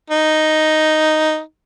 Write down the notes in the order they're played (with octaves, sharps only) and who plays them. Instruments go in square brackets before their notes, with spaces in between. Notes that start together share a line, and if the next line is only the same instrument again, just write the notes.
[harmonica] D#4